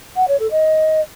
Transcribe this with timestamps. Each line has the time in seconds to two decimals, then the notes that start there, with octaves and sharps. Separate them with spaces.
0.16 F#5
0.28 C#5
0.39 A4
0.51 D#5